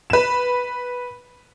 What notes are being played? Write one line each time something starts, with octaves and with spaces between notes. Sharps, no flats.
B4 E7